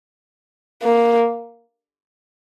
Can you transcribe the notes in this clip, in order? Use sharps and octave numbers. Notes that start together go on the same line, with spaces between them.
A#3